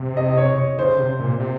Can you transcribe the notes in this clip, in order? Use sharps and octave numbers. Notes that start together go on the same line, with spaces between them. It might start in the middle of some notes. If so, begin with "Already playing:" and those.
Already playing: C3
D#5
C#5
C#5
C#3 C5
C3
A#2
C3